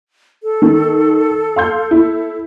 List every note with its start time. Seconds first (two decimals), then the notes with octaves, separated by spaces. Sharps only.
0.43 A4
0.62 D#3
1.56 F5 C6 G6
1.91 E4